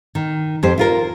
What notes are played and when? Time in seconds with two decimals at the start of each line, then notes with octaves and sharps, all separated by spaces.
0.15 D#3
0.63 F2 G4 C5
0.78 E4 F4 A#4